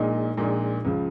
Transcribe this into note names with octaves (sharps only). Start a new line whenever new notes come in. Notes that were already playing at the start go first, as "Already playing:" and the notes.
Already playing: A#1 A#2 G#3 D#4
A#1 A#2 G#3 D#4
C#2 C#3 F3